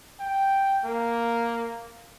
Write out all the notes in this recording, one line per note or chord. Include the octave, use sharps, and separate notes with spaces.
G5
A#3